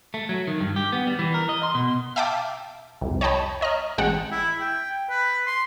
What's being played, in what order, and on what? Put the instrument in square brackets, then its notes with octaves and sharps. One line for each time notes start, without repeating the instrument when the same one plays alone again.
[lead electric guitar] A3
F#3
D#3
G2
G4
B3
G3
E3
A#4
D#5
C6
B2
[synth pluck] E5 F5 G5 A5 D6
C2 F2
C#5 D#5 G5 A5 B5
C#5 D#5 A#5 F6
A1 G#3 F#5 G5 A5
[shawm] E4
G5
B4
C6